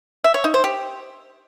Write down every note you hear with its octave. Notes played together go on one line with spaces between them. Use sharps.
E5
C#5
D#4
C5
G4